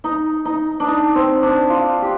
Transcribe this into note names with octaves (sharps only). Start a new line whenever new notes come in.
D#4
D#4
D4
D#4
C4
D4
F4
G4